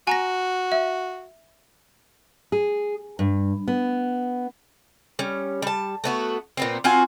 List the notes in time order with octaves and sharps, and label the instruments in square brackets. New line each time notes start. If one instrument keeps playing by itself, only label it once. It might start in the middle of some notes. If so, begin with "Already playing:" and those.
[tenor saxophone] F#4 [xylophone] G#5 A#5 A#6
[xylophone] E5
[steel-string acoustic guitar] G#4
G2
B3
[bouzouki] G3 C#4
G3 A5
A3 B3 F#4
A#2 B3 C4
C4 F4 F#4 G#5